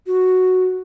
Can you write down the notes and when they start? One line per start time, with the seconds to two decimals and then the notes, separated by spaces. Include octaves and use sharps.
0.07 F#4